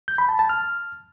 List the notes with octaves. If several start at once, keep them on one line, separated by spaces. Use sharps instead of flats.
G6
B5
A5
A5
F6